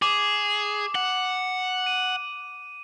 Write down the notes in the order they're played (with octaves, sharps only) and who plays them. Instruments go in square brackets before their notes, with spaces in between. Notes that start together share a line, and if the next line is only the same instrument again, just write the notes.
[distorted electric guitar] G#4 [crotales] D6
[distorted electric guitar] F#5
[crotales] D#7